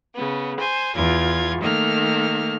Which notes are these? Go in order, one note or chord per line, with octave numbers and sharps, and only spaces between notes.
C#3 B3
C5 G#5
E2 F4 G#6
D#3 A3 A#3 F6